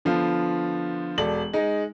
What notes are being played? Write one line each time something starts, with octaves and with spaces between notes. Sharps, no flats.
D3 F3 B3 F4
E1 A4 D5 F#7
G#3 D#4